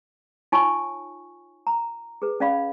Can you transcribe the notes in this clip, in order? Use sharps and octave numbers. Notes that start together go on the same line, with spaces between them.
D#4 F4 C#5 G#5 C#6
A#5
G#4 B4
C#4 D5 F5 B5